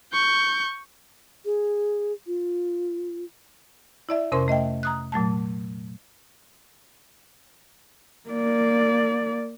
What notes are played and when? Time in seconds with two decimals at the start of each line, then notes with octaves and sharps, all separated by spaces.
0.13 C#6 G6
1.45 G#4
2.27 F4
4.09 E4 D5 E5
4.32 F2 C3 C#4 A#4 C5 C6
4.48 A3 D#5 E5 G5
4.83 A#5 D#6 F#6
5.12 A#2 F#3 A3 A5
8.30 A#3 D5